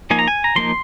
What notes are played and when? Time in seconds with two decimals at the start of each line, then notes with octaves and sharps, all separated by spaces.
0.10 F3 A#3 D#4 G#5
0.19 A#5
0.28 G#5
0.44 A#5
0.56 F3 A#3 D#4 C6